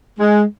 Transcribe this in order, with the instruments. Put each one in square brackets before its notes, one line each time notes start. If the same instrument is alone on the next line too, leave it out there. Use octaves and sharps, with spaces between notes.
[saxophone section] G#3